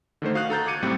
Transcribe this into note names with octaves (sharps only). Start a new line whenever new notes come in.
D3 D#3 A3 C5
F#4 F5 D#6 F6 F#6
A4 A#5 G6 A6
D6 G#6 C#7 D#7
A2 G3 C4